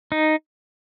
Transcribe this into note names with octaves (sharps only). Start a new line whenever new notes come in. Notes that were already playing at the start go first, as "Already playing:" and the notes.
D#4